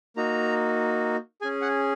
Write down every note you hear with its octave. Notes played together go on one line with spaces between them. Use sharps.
A#3 D#4 F#4 A#5
C#4 G#4 G#5
F#5